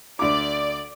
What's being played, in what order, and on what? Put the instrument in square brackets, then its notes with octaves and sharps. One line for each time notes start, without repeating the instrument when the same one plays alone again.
[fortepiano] D2 D6 [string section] D5